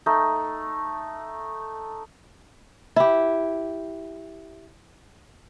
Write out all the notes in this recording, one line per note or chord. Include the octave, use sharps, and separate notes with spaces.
A3 D#4
E4 G4